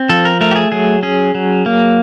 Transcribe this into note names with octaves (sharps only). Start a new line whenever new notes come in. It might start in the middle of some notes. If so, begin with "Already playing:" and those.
Already playing: C4
F3 A4
A#4
A3 A#4
G4
G#4
F#3 G#4
C#4 G#4
F#3
A#3